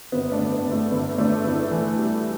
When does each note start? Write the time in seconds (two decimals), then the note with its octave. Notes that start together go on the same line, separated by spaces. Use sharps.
0.12 G1 B3
0.32 A3 D4
0.38 G1
0.52 B3
0.65 G1
0.72 A3
0.91 G1 B3
1.18 G1 A3 D4
1.44 G1 B3 E4
1.71 E3
1.98 G3